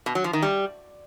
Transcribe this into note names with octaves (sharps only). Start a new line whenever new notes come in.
B2
F#3
F3
D#3
G3